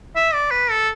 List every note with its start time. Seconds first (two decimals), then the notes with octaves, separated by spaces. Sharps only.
0.16 E5
0.34 D5
0.51 B4
0.70 A4